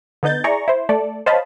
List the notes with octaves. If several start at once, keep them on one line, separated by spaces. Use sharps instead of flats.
D3 B3 D#4 G6 A6
E4 G#4 D5 A#5 C#6
E4 C5
A3 A4 D5
C5 C#5 D#5 F5 A5 B5